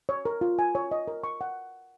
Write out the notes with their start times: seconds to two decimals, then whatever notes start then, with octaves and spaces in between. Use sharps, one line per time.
0.09 C#5
0.25 A#4
0.41 F4
0.59 G#5
0.75 C#5
0.91 D#5
1.08 A#4
1.24 C#6
1.41 F#5